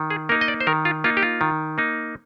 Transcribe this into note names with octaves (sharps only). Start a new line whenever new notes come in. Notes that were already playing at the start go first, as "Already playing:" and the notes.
Already playing: D#3
G#4
A#3 D#4 A#4
D#5
D5
C5
D#3 A#4
F4
A#3 D#4 F4
G4
F4
D#3
A#3 D#4